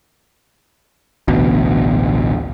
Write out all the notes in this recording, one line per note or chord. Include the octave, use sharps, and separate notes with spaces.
A1 D2 B2